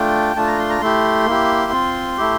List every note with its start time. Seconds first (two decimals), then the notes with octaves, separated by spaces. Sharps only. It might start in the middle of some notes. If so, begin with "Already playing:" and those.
Already playing: A3 D4 F4 G5
0.36 A3 D4 F4 A5
0.47 A#5
0.59 C6
0.70 A#5
0.81 A3 E4 G4 C6
1.26 A#3 E4 G4
1.72 C4 F4
2.17 A3 E4 G4